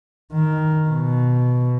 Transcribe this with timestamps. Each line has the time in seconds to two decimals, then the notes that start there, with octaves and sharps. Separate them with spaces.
0.33 D#3
0.89 B2